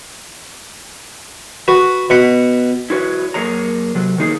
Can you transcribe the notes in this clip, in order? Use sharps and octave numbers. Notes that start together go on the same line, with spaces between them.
F#4 B4
B2 F#5 B5
E4 F#4 B4 C#5
F#2 A#3 G#4 C#5 A#5
C3 F#3
D#3 A#3 D#4 G#4